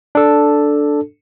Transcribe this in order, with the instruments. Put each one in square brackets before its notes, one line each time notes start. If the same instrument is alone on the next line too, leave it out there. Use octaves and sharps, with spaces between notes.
[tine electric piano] D4 A4